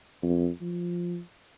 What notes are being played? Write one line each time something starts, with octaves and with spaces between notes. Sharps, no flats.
F2
F3